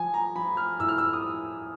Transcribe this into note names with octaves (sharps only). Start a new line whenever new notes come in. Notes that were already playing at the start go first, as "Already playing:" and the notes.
Already playing: F3 G#5
A#5
F3 B5
F6
A2 E6
F6
E6
D#6